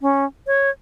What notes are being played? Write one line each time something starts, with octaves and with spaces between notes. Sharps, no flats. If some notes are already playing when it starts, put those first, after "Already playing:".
C#4
C#5